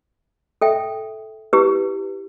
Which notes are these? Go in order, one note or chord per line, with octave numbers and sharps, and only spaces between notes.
A4 E5 G5
E4 G4 B4